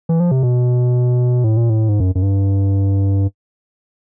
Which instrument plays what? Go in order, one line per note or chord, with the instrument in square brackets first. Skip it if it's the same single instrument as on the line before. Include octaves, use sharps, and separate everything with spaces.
[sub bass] E3
F3
C3
B2
A2
A#2
A2
G#2
F#2
F#2
G2